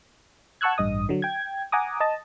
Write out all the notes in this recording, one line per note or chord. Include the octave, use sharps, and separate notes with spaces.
F#5 A5 C#6 E6 F#6 G#6
A1 G2 D#5 D#6
D3 F#3
G5 G#6
F#5 G#5 A#5 D6 D#6
D#5 A5